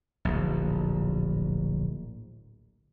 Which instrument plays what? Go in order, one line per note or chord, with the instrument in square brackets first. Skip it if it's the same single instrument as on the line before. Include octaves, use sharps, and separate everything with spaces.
[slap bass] D1 A#1